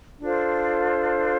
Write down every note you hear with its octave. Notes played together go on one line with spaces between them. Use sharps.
D4 F4 A4 C5